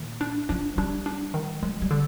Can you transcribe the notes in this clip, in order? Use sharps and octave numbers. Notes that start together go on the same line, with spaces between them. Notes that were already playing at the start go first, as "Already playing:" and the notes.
Already playing: A#2 D#3
D4
F3 D4
G3 D4
D4
D#3
F3 G#3
G3
D3